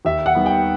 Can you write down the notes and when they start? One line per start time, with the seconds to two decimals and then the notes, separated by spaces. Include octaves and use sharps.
0.05 D#2 E5
0.26 F#5
0.35 D#3 G3 B3
0.46 G5